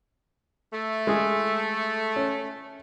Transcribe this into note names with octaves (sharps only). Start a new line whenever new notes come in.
A3
G#3 G#4
C#4